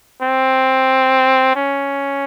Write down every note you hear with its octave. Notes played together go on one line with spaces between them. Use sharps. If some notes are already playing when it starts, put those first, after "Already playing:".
C4
C#4